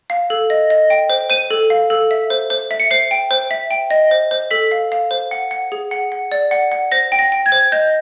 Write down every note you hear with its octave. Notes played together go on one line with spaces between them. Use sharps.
F5
A4
D#5
D#5
G5
C5
C5 D#7
A4
F5
A4
E5
C5
C5
E5
C#7
C5 C7
G5
C5
E5
G5
D#5
C5
C5
A4 B6
F5
F5
C5
F#5
F#5
G#4
F#5
F#5
D5
F#5
F#5
C5 A#6
G5
A#6
G5
G#6
C5
D#5 G6